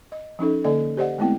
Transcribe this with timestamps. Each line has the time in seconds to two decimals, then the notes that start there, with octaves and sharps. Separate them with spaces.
0.12 D#5
0.39 F3 C#4 D#4 A4
0.64 D3 A#3 A4 D5 D#5
0.97 G4 C5 D5 D#5 F#5
1.18 G#3 A3 B3 C4 E4 G5